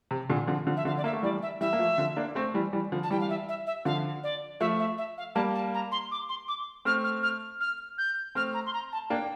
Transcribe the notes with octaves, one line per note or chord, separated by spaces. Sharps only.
C3
A#2 D3
D3 F3
D3 F3
E5
D3 F3 F5
D5
A#3 E5
A3
E3 G3 D5
E5
E3 G3 E5
A#3
F3 A3
D3 F3
A#3 D4
A3 C4
E3 G3
E3 G3
D3 F3
A5
E3 G3 G5
F5
E5
E5
E5
D3 F3 F5
D5
F3 A3 E5
E5
E5
F5
G3 A#3 A5
A5
A#5
C6
D6
C6
D6
A3 C4 F6
F6
F6
F6
G6
A3 C4 F6
A#5
C6
A#5
A5
A#3 D4 G5